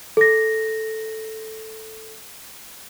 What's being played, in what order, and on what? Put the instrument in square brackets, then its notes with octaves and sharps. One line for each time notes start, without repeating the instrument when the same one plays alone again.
[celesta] A4 A#6